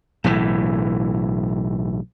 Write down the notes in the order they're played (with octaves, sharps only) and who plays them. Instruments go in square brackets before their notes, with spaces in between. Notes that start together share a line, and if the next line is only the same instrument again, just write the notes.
[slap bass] B1 A2 E3